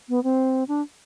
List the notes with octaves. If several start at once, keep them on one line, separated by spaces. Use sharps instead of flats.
B3
C4
D4